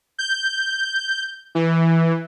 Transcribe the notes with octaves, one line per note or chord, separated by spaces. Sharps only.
G6
E3